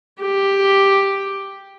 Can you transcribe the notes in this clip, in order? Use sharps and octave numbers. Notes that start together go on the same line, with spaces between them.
G4